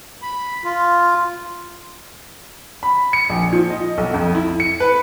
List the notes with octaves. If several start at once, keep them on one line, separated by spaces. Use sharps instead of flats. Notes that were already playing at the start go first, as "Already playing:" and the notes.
B5
F4
B5
C#7
A#1
F3
D#5
B1
F2
E4
C#7
B4